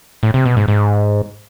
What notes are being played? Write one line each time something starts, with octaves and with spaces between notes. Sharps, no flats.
A2
C3
B2
G#2
G#2